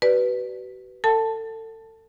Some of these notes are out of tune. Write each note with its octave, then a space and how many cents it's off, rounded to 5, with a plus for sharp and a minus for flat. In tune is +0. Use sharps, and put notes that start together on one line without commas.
F#4 +45 B4 +0 D5 +0
A4 +30 F#5 +45 A5 +0